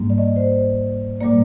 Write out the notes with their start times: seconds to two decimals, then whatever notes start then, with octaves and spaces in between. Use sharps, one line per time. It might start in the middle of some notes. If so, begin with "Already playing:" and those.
Already playing: G#2 G3 A#3
0.10 D5
0.18 D#5
0.36 C5
0.52 C5
1.20 A#2 G3 A#3 D5